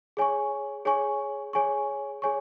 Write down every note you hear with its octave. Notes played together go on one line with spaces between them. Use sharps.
G#4 C#5 G#5 C#6
G#4 C#5 G#5 C#6
G#4 C#5 G#5 C#6
G#4 C#5 G#5 C#6